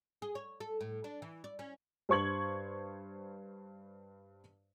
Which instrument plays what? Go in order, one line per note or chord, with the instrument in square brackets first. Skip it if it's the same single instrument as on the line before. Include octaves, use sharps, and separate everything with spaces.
[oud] G#4
C#5
A4
A2
D4
E3
D5
C#4
[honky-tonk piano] G2 C5 C#6 G#6 F#7